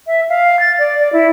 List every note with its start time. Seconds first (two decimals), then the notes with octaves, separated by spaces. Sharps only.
0.07 E5
0.29 F5
0.60 A6
0.79 D5
0.99 D5
1.13 E4